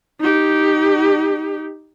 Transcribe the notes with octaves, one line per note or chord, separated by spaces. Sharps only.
D#4 G4